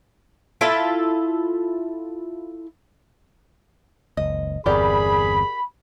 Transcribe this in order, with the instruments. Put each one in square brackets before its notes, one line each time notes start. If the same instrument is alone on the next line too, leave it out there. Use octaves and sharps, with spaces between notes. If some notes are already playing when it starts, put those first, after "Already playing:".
[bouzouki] E4 F4 A4 E5
[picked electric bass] F#1 C#2 [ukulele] D#5
[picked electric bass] G1 E2 C4 [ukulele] G4 A#4 D5 [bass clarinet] G#4 [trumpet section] B5